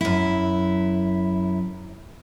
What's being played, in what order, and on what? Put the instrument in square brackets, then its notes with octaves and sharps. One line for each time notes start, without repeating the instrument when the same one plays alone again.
[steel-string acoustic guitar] F#2 E4